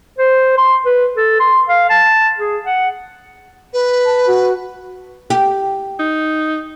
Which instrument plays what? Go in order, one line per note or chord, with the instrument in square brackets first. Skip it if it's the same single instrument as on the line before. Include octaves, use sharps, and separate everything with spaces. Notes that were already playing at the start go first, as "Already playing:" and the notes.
[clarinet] C5
C6
B4
A4
C6
F5
A5
G#4
F#5
[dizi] B4
[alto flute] A5
F#4
[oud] G4
[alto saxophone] D#4